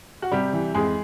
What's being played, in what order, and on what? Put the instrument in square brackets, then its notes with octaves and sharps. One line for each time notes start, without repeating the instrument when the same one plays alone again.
[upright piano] F#4
C3 G3 G4
E3
F2 G#3 G#4